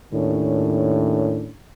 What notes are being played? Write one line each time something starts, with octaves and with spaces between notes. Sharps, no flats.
D#2 A2 D#3 C#4 D4